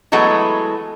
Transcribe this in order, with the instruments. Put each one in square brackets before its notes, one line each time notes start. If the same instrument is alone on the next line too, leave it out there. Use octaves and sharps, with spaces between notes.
[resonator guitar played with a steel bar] E3 F#3 G#3 A3 B3